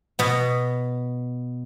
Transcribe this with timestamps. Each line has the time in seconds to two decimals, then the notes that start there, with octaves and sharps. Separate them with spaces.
0.19 B2 B3